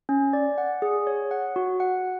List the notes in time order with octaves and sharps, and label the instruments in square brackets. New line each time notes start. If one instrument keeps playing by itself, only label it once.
[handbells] C#4
D5
F#5
G#4
C#5
F#5
F#4
F#5